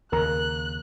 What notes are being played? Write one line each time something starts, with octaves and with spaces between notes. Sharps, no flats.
D#2 C#3 A#4 A#5 F#6